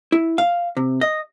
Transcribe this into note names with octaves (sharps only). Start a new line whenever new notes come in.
E4
F5
C3
D#5